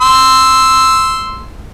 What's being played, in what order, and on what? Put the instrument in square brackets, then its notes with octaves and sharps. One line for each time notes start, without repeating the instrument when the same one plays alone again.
[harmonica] C6 E6